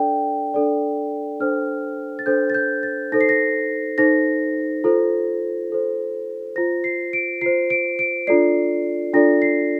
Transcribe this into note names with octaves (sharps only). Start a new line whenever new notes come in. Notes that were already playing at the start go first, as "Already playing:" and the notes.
Already playing: D4 A4 D5 G5
D4 A4 D5
D4 A4 C5 F6
A6
D4 A4 C5 G6
A6
G6
A6
D#4 A4 C5 A#6
C7
A#6
D#4 A4 C5 A#6
F4 A4 C5
F4 A4 C5
F4 C5 A#6
C7
D7
F4 C5 C7
D7
D7
D4 F4 A4 D5 C7
D4 F4 A4 D5 A#6
C7